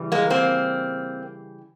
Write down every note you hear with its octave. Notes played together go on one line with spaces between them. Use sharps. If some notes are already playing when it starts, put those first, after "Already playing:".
Already playing: C#3 E3 G3
G#3 A#3
A#3 C4